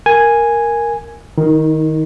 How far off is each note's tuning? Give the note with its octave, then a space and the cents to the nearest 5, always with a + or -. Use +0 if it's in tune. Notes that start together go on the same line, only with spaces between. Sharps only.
A#4 +0 G#5 +0
D#3 +0 D#4 +35